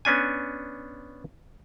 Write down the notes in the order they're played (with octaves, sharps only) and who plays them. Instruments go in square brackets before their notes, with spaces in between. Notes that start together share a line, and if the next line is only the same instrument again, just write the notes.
[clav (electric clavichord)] B3 C#4 D4 G#5